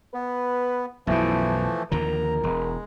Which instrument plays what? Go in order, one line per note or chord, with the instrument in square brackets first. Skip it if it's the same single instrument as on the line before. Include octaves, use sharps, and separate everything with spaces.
[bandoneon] B3 [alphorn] B4
[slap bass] B1 F#2 B2 [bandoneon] E3 F3 A3 [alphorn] E4
[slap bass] D#2 D3 F3 [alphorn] A#4 [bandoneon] A#5
[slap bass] E1 [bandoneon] G#3